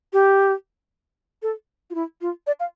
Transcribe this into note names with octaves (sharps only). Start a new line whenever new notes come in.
G4
A4
F4
E4
F4
D5
F5